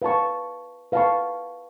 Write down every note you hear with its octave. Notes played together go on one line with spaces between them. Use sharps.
B4 F5 A5 C#6
B4 F5 A5 C#6